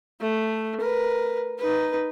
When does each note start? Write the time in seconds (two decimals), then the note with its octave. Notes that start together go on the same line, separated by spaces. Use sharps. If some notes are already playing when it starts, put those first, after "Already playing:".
0.20 A3
0.80 A#4 B4
1.59 D#4 B4